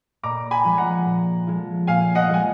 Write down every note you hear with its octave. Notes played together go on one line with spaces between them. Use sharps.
A#2 A#5 D6
G#5 B5
F3 G#3
F#5 A#5
A#2
F3 G#3
A#2 F5 G#5
D#5 F#5
F3 G#3 G#5